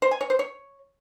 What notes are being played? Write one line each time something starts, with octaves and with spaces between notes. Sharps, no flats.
C5
G#5
C#5
C5
C#5